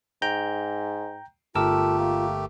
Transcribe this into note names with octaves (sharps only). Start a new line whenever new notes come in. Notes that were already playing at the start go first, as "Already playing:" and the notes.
G#2 G5 A#5 G6
G1 A3 F4 G4 A4 A#4 E6
A#3